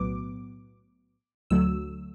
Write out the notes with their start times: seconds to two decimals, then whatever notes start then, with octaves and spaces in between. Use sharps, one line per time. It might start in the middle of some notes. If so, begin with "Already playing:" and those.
Already playing: B1 A2 F#3 B3 D6
1.50 D2 D3 F#3 A3 E6